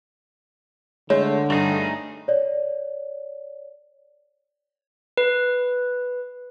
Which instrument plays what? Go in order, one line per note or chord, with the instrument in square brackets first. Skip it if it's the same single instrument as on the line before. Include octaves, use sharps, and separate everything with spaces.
[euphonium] D3 [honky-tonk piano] G#3 [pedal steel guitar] A3 [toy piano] C#5
[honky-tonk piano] G2 [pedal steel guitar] A3 D#4 G#4
[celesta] C#5 D5
[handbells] B4